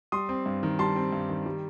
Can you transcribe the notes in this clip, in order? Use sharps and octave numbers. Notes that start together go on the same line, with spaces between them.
G3 C6 D#6
C4
G2
D#3
G3 A5 C6
C4
G2
D#3
G3